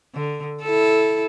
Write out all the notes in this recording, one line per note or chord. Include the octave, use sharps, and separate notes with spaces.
D3
E4 A4